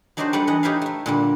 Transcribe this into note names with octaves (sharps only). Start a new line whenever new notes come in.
F#3 D4 D#4 F#4 G4 C5
G3 D4 A4 B4 D5 F#5
E3 D#5 F#5
D#4 G4 B4 C#5 E5 F5
A3 E5
A#2 D3 G3